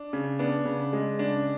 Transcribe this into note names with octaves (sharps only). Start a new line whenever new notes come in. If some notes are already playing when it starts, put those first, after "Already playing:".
Already playing: D4
C#3
B3 D4
C#3
G#3
C#3 D4